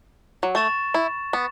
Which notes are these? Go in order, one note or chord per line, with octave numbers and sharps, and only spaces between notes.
F#3
A3 C#6 A6 E7
E4
B3